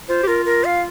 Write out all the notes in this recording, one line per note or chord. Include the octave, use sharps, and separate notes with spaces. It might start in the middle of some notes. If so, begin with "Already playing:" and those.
F4 C5
G4
F4 A#4
A#4
F5